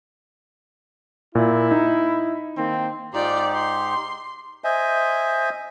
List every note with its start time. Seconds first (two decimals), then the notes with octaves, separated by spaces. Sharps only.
1.35 A#2 E4
1.71 D#4
2.56 D#3 A#3 C4
3.14 G#2 D#4 F4 G4 D5
3.54 C6
4.64 C5 D#5 E5 G#5